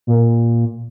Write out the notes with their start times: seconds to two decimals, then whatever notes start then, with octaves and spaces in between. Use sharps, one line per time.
0.07 A#2